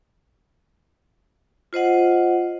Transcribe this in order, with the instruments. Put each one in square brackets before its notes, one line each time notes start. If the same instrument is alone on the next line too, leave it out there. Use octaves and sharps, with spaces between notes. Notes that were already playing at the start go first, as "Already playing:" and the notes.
[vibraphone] F4 C5 D#5 F#5